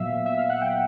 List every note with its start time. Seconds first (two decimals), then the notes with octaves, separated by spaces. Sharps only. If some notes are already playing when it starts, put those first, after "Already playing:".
Already playing: A#2 F#3 B3 E5 F5
0.26 E5
0.38 F5
0.50 F#5
0.62 G5